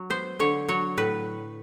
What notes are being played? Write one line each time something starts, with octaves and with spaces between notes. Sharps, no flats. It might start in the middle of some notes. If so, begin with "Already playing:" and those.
Already playing: F#3
B3 C5
D3 C#5
F#3 C#5
A2 B4